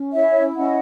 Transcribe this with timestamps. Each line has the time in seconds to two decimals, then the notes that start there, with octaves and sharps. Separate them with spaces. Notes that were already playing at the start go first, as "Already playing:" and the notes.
Already playing: C#4
0.14 E4 C#5 E5
0.56 C#4 D#5 F#5